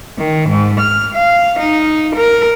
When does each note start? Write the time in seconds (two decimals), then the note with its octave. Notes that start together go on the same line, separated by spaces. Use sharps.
0.19 D#3
0.50 G#2
0.80 F6
1.14 F5
1.60 D#4
2.15 A#4